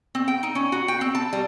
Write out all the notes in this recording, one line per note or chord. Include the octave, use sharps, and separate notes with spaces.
C4
G5
D#4
C#4
F#4
G5
C4
A5
G3